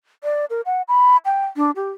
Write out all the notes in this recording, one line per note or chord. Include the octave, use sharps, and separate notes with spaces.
D5
A#4
F#5
B5
G5
D4
G4